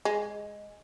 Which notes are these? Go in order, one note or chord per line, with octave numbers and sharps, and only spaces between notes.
G#3